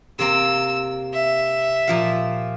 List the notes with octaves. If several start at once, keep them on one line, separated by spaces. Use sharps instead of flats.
C3 A#3 C4 E6
E5
A#2 F3 F5